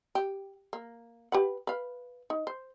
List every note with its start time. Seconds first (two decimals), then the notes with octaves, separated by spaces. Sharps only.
0.15 G4
0.73 A#3
1.32 G4 B4 F#5
1.67 B4 F5
2.30 D#4
2.47 C5